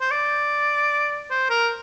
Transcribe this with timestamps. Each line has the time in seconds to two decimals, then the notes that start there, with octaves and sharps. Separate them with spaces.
0.01 C5
0.11 D5
1.31 C5
1.50 A#4